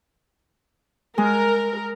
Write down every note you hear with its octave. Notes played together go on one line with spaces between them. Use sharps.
G#3 A#4